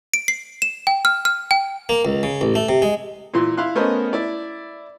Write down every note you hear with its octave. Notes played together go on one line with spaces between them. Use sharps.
D7
C7
E7
G5
F6
F6
G5
A#3
C#2
C#3
A1
A3
C3
G#3
A#2 E3 C6
E4 F5 C6 F#6
A3 B3 C#4 A#4 C5 D#5
E4 D5